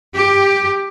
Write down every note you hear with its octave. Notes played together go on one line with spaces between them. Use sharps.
G4